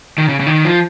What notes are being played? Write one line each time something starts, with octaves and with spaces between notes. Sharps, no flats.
D#3
C#3
C#3
D#3
F3